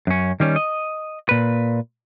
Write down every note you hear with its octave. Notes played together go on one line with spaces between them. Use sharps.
F#2 C#4
D#3 G3 C#4
D#5
A#2 B4